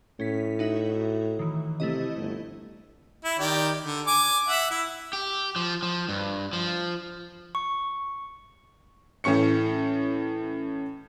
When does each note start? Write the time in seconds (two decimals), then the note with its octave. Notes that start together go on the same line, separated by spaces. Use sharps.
0.20 A2 C#4 B6
0.59 D#4 F#4 E5
1.39 D#3 E3
1.80 C3 A3 E4 D#5
2.17 G1
3.24 E4
3.39 D#3 G4 D5
3.84 D3
4.07 G#5 D6
4.48 E5 F#5
4.70 E4
5.13 G4
5.56 F3
5.83 F3
6.09 G2
6.53 F3
7.55 C#6
9.24 A2 E3 C#4 C#6 C#7